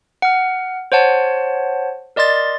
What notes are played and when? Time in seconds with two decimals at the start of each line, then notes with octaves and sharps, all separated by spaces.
0.22 F#5 F6
0.92 C5 C#5 F#5 A5
2.16 A#4 D5 D#5 C6 A6